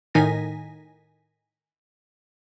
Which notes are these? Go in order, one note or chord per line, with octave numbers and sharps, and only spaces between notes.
A2 D#3 D#4 G#5 A#6 B6